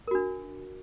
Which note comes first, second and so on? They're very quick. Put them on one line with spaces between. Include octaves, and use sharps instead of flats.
A#4 F#4 D4